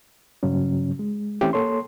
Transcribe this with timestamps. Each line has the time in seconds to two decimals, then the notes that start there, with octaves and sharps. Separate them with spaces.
0.43 G2 C#3 F#3 C#4
0.99 G#3
1.41 E3 A3 C4 C#4 E4 G4
1.53 A#3 A4 C#5 C6